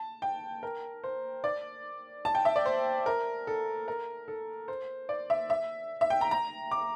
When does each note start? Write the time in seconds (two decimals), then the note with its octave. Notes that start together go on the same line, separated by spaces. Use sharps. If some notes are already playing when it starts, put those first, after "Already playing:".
Already playing: A5
0.22 G5
0.63 A#4
1.04 C5
1.44 D5
2.25 A5
2.35 G5
2.45 E5
2.56 D5
2.65 C5
3.06 A#4
3.47 A4
3.88 A#4
4.28 A4
4.68 C5
5.09 D5
5.30 E5
5.50 E5
6.01 E5
6.10 G5
6.21 A#5
6.31 A#5
6.71 D6